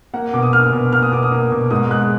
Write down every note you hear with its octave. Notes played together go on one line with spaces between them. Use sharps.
A#3 F#5
B2 D6
D#6
A#3 F6
B2
A#3 F6
D#6
B2 D6
D#6
A#3
B2
G#2 D#6
G#2 F#6